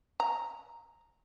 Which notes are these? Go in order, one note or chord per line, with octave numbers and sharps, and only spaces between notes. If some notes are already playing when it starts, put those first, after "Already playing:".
A#5